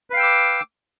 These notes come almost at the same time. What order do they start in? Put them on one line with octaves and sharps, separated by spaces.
B4 F5 G5 E6 D6